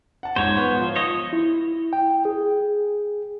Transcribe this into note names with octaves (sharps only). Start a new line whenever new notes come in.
F#5 A5
D#1 G#2 C5 C#5
B3
F3 F4
C#5 D#5
E4
G5
G#4